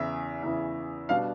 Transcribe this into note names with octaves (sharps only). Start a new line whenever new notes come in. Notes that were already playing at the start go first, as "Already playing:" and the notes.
Already playing: E2 C#3 E3 E5
E2 C#3 E3
B2 G3 B3 D4 F5